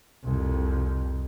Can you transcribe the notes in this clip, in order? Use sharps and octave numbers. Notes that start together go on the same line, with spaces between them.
C2 F2